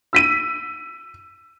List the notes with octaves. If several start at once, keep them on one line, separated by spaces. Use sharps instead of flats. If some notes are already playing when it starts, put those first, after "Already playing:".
E6 B6 D#7